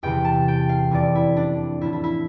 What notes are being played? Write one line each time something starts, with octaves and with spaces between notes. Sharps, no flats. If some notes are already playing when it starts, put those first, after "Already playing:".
E2 C3 E3 G5
A5
G5
F5
F2 E3 D5
E4
D4
A2 F3 E4
E4
E4